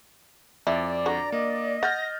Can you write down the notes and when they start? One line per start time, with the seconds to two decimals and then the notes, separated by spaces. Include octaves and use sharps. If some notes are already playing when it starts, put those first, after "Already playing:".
0.67 F2 E4 D5
1.06 D3 F#4 A#5
1.32 A#3 D#5
1.83 F#5 F6 G6 A6 A#6